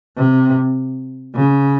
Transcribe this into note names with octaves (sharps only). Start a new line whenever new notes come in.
C3
C#3